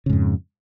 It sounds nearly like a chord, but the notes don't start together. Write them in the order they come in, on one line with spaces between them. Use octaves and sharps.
C#3 G#2 F2